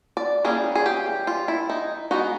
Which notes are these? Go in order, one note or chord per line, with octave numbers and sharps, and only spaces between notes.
D5
E3 G3 A#3 C#4 G#4
G#4
G4
F4
E4
D#4
G#3 B3 D#4 F#4